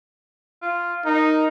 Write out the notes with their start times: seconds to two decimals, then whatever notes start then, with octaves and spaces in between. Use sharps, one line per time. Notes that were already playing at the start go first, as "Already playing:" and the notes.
0.62 F4
1.05 D#4 A#4